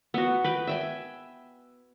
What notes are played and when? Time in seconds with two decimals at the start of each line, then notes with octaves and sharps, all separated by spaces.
0.14 B3 F#4
0.44 B4 G5 B5
0.67 E5 G5 G#5